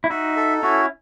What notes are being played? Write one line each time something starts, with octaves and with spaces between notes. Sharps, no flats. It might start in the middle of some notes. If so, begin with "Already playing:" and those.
E4
D#4 F#4 E5
A4
C#4 E4 F#4